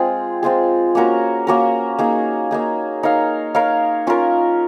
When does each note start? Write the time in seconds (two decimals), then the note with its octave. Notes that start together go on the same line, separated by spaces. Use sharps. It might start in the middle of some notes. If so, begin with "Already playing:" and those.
Already playing: G#3 C4 F4 G#4
0.43 G#3 C4 F4 G#4
0.95 A#3 C#4 F#4 A#4
1.47 A#3 C#4 F#4 A#4
1.99 A#3 D#4 G#4
2.51 A#3 D#4 G#4
3.03 D#4 A#4 C#5 F5
3.55 D#4 A#4 C#5 F5
4.07 C#4 F4 A#4